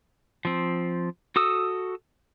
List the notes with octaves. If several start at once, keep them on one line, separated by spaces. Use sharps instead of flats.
F3 C4
F#4 A4 D#6 E6